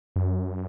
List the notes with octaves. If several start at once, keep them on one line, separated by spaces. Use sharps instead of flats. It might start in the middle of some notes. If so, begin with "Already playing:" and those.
F#2